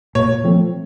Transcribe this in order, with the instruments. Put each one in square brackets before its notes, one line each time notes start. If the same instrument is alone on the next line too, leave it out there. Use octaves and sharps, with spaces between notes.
[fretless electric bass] A#2 [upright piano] C#5
[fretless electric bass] F3 A3 C4